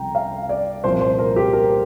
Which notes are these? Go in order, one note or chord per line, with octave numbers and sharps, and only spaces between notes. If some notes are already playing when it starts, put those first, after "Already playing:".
Already playing: C2 C3 F3 G5 A#5
F5
D5
C2 A#2 F3 C5
C5
A#4
G4
A#4